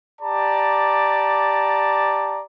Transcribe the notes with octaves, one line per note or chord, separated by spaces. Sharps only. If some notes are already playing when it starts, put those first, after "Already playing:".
G4 D5 A5 A#5